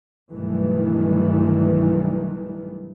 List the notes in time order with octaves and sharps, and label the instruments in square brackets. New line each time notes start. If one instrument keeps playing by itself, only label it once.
[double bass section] B1 G2 D#3 E3 A3